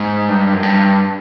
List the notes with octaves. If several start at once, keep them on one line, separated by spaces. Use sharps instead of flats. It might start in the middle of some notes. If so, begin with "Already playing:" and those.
Already playing: G#2
G2
F#2
G2